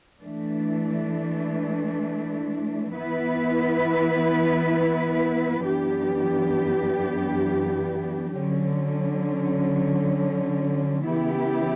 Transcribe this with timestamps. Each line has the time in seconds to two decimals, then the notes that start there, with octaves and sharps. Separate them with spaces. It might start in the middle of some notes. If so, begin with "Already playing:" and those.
0.22 E3 A3 D4
2.93 E3 B3 E4 B4
5.63 F#2 E3 B3 D4 G4
8.34 D3 F#3 C#4
11.05 C#3 E3 B3 E4 G4